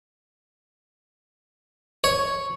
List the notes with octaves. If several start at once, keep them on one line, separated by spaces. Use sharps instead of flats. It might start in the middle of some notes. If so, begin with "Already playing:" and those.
C#5